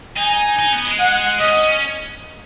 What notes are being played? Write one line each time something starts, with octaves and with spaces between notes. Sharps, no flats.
D#4 G#5
D#4
B3
G#3
F#5
C#4 D#5